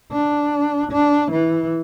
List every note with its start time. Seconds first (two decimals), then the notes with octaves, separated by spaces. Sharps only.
0.12 D4
0.91 D4
1.31 E3